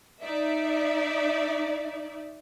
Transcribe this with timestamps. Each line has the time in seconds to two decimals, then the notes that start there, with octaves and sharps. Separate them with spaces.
0.21 D#4 D5 E5